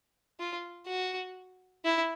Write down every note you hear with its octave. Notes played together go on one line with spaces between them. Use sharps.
F4
F#4
E4